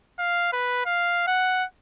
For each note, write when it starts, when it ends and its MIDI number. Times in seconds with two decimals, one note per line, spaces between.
0.19 0.50 77
0.53 0.82 71
0.86 1.23 77
1.27 1.65 78